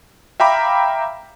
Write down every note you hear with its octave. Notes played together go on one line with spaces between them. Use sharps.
E5 F5 G5 A#5 B5 D6